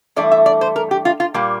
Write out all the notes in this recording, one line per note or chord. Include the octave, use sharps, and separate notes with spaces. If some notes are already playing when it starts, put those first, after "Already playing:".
G2 E3 A3 D5
E5
D5
C5
A#4
G4
F4
F4
A#2 G3 A#3